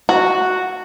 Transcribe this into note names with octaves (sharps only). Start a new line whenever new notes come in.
F#4